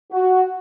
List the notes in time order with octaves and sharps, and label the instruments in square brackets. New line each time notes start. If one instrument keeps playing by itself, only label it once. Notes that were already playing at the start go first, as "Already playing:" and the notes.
[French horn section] F#4